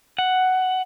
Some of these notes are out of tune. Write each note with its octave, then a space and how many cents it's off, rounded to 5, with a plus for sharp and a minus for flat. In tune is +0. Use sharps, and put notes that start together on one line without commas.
F#5 +5